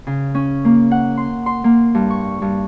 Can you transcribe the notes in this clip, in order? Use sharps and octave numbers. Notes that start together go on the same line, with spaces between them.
C#3
C#4
A#3
F#5
C6
C6
A#3
G2
C#6
G2